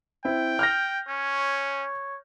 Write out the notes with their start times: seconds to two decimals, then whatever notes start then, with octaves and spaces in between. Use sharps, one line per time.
0.25 C4 E4 G5
0.59 F6 G6 A#6
1.08 C#4 C#5